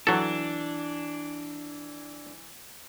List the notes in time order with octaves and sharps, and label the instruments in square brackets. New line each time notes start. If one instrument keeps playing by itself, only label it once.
[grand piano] E3 [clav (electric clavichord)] F#3 A4 [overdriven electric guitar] D4